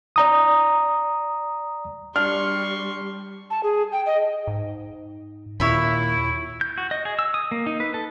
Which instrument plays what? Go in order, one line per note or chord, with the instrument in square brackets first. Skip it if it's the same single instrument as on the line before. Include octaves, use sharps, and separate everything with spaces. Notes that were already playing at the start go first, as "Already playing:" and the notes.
[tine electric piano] D5 A#5 D#6
[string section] G3 [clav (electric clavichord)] D4 [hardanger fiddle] C6 C#6 [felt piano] F6
[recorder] A5
G#4
G5
D#5
[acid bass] G#2
[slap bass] D#2 [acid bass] A#2 [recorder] E4 [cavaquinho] C#5 E5 B5
[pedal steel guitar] G6
F#4
D#5
G#4
E6
D#6
A#3
D#4
B4
A4